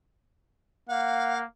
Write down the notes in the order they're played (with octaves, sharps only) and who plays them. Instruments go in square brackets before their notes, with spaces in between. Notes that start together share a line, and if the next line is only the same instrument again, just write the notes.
[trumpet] A#3 [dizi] F5 [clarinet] F#5